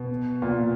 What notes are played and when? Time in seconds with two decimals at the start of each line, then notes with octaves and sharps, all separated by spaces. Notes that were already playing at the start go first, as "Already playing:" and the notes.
Already playing: B2
0.42 A#2